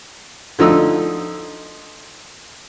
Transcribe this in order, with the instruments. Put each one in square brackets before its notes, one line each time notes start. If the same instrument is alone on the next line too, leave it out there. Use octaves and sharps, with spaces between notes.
[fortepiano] D3 F3 D#4 E6